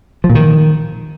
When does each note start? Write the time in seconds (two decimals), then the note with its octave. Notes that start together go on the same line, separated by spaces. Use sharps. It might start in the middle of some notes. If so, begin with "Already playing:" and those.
0.24 F3
0.30 A#2
0.35 D#3